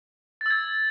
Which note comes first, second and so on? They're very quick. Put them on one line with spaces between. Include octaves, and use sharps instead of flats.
A6 E6 G#6